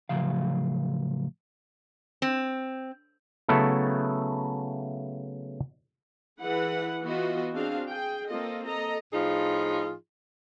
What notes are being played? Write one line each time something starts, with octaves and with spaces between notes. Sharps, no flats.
A2 C#3 F3 F#3 F5
C4
C#3 F#3 A3 B3 E4 A4
E3 E4 G#4 B4 F#5
E3 B3 F4 F#4 D#5
C4 D4 F#4 G#4 F5
G#4 G5
A#3 C4 F4 A4 D#5
A4 D#5 A#5
A2 F3 D#4 F4 G#4